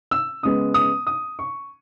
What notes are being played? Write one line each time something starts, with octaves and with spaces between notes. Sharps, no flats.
E6
C#3 G#3 B3 D#6
D#6
D#6
C#6